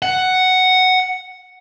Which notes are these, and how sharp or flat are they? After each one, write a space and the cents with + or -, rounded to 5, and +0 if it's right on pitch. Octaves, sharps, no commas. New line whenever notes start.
F#5 +5